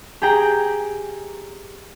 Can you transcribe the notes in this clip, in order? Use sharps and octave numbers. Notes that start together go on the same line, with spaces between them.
G4 G#4 G5 A#5